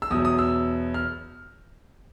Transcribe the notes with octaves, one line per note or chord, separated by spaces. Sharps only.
E6
E2 B2 F#3 D#6
D#6
E6
F6